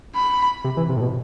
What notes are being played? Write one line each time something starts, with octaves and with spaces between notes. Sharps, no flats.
B5
C3
E3
C3
A2
B2